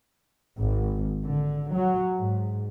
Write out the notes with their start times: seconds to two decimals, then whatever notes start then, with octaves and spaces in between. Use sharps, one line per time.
0.60 G#1
1.25 D3
1.74 F#3
2.19 G#2